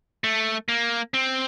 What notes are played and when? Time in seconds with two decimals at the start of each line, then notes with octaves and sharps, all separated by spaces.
0.24 A3
0.69 A#3
1.14 C4